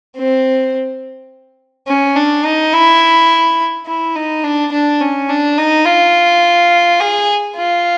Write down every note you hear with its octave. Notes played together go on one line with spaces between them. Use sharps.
C4
C#4
D4
D#4
E4
E4
D#4
D4
D4
C#4
D4
D#4
F4
G#4
F4